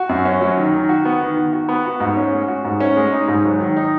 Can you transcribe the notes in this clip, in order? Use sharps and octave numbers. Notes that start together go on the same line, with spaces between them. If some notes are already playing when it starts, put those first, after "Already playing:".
Already playing: F#4
F#2
C#4
F#3
D#3
D#3
F#4
B3
D#3
D#3
F#4
B3
F#4
G#2
C#4
G#3
F#4
G#2
C#4
G#3
D#4
G#2
F#3
D#3
D#4